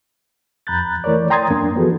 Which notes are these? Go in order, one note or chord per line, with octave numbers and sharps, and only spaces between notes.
F2 A#5 B5 F#6 G6 A6
E3 A3 A#4 C#5 D5
G5 A#5 C6 D#6 G#6 A6
F#2 A#3 D4
E3 F3 B3 F#4 G#4 A4